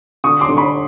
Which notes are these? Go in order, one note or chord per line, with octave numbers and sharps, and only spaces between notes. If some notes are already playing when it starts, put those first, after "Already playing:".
D3 C#6 D#6
C6 D6
D3
B5 C#6